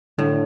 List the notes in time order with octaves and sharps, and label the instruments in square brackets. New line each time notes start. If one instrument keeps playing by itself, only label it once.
[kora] A2 [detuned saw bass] D3